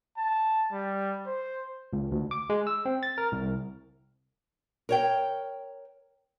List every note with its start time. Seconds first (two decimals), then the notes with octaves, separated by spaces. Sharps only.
0.17 A5
0.72 G3
1.27 C5
1.93 C#2
2.12 D2
2.31 D6
2.50 G#3
2.67 E6
2.85 C4
3.03 A6
3.18 A#4
3.32 C2
4.89 A#4 C#5 G5